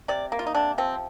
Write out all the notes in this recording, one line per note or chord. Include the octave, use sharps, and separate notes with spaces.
C3 D5
A#3
F4
D#4
C3 D4
F3 C4